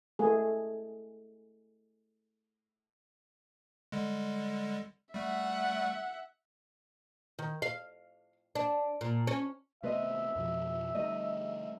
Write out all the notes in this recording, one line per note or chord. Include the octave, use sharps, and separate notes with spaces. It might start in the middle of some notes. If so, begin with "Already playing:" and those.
A3 G#4
D3 G3 G#3
G3 A3 E5 F#5
D#3
F5
D4
A#2
C#4
C3 A3 B3 B4 C5 D#5 E5
F2 B2 F3
D3 G3 A3 D#4 D#5